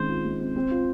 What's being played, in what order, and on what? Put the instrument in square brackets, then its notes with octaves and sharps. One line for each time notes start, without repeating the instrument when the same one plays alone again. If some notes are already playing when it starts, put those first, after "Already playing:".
Already playing: [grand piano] D#3 G#3 C4 C#4 [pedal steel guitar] C5
[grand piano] F4
G#3
C4
C4
F4